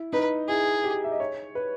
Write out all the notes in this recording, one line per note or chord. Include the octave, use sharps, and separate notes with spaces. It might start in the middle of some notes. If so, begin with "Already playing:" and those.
Already playing: E4
D#4 B4
E4 G#4
G4
E5
D#5
C#5
B4